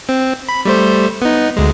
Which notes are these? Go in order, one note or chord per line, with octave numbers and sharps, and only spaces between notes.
C4
B5
G3 A3 C5
B3 D#4
D2 G#3